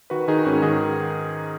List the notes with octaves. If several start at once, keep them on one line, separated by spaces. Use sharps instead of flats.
D#3 F#4 B4
D#3 D#4 G#4
G#2 C#4 F#4
D#3 D#4 G#4